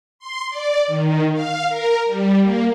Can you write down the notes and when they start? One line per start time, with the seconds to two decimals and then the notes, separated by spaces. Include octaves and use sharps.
0.19 C6
0.50 D5
0.87 D#3
1.33 F5
1.68 A#4
2.06 G3
2.41 A#3